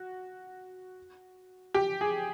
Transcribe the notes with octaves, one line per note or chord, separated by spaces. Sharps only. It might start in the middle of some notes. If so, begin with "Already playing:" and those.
Already playing: F#4
G4
G#4